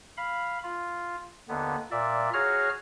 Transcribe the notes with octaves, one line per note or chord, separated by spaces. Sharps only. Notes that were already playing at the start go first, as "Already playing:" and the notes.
F5 B5
F4
D#2 D3 B3
A#2 D5 E5
F#4 G#4 C#5 F5 A#5 F6